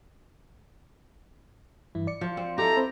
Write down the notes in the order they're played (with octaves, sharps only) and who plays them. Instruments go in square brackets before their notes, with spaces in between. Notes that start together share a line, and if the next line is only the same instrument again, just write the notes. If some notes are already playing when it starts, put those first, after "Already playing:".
[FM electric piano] G2 E3 E4
D5 C#7
[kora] F3
C4
[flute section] E4 A4 D#5 [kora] G4 [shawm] A#5
[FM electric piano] C4 C5 B5